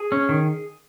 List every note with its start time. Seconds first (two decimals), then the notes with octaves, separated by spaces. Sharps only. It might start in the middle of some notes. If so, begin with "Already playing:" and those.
Already playing: G#4
0.12 C#4
0.29 D#3